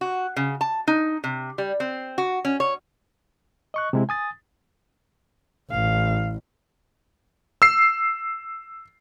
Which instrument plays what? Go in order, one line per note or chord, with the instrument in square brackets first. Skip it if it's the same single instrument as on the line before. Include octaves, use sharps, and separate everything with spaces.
[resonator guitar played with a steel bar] F#4
C#3
A5
D#4
C3
G3
C4
F#4
C#4
C#5
[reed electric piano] D#5 C#6 F#6
C3 G#3 E4
G#5 D#6 A6
[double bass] A1 [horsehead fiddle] F5
[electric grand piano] E6 C7